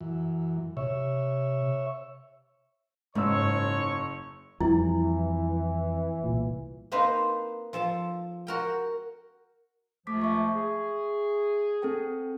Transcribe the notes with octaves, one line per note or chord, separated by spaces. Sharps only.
F#2 E3
C3 C#5 E5
F#1 G#2 C#5 C#6 E6
F2 E3 G3 E4
C2 A#2
A#3 C4 D#4 B4 C5
F3 A4 A5
F#4 A#4 G5
C#2 C3 F3 A3 D6 B6
E5 C#6
G#4
C4 A4 G5